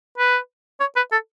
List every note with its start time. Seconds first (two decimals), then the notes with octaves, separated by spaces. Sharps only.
0.18 B4
0.80 C#5
0.96 B4
1.12 A4